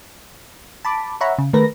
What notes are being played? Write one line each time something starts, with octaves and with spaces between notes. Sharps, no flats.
A5 B5 D6
C#5 E5 F#5 A#5 B5
C#3
D#3 A3 A#4 B4 A#6